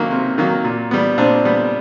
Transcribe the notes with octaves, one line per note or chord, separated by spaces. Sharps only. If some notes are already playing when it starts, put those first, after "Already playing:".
Already playing: C3 D#3 F#3 A#3 C#4
C3
D#3 F#3 A#3
A#2
G3 B3
A#2 C4 D4
G3 B3